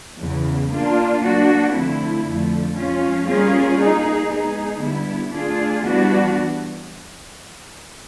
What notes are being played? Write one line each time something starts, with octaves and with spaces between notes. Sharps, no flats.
E2 C#3 E3
A#3 D4 F4
F#3 A#3 D4 F#4
D3 F3 A3 C4 E4
F2 D3 F3 A3
F3 G#3 C#4 F4
G3 A#3 C#4 F4 G#4
A#3 D#4 G#4
G#3 B3 D#4 G#4
D3 G3 B3 E4
A3 D4 F4 G#4
E3 G3 B3 D4 F#4